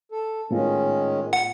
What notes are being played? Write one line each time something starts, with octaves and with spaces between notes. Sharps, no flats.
A4
A2 D#3 G#3 B3 C#4 F4
F#5